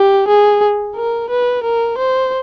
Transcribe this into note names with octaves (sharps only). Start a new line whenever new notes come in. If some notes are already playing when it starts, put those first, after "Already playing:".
Already playing: G4
G#4
A#4
B4
A#4
C5